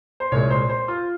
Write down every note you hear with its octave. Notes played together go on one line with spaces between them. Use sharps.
C5
C2 A#2 G#3 C#5
C5
C5
F4